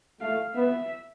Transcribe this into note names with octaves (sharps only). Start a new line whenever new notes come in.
A3 F5
B3 E5